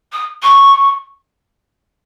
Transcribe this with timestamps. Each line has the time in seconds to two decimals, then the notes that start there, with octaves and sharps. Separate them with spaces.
0.12 D#6
0.43 C#6